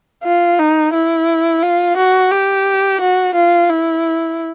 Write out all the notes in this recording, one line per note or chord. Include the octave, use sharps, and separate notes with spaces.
F4
D#4
E4
F4
F#4
G4
F#4
F4
E4